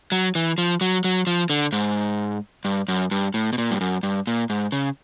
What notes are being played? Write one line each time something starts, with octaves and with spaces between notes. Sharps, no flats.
F#3
E3
F3
F#3
F#3
F3
D3
G#2
G2
F#2
G2
A2
B2
A#2
G2
F#2
G2
A#2
G#2
C#3